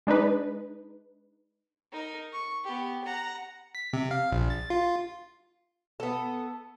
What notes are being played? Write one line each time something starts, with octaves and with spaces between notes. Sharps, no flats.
G#3 D4 D#4 B4
D#4 A#4
C#6
B3 G4
F#5 A#5
B6
C3
F5
A#1
A6
F4
B3 A4